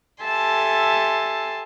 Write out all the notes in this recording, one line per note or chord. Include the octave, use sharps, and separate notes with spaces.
G4 A4 E5 G#5 A5 C6